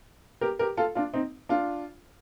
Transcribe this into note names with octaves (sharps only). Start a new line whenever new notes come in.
G4 A#4
G4 A#4
F4 A4
D4 F4
C4 D#4
D4 F4